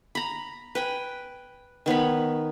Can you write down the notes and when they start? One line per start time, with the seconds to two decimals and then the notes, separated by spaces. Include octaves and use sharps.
0.15 A#5 B5
0.75 B4 G5 G#5
1.86 D#3 B3 C#5 B5